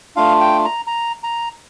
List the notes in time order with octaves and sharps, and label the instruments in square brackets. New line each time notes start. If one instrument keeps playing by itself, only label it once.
[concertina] A3 D4 F4 F5
G5
A#5
A#5
A#5